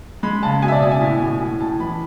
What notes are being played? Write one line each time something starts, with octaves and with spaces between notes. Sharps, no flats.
G#3 B5
C#3 A5
B2 G#5
E5
D5
B2 D5
G#5
A2
A2
A2 G#5
A2 A5
E3 B5